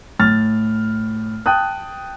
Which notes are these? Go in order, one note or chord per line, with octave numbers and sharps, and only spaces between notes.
A2 F6 A6
G5 A5 D#6 F#6